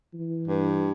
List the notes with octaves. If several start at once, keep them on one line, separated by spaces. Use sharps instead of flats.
E3
G2